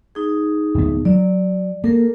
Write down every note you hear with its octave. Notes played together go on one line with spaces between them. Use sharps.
D#4 G#4
D1 B3
F#3 D5
A#3 A4 A#4